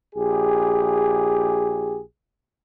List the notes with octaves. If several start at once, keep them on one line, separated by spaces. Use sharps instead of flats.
A#1 G4 G#4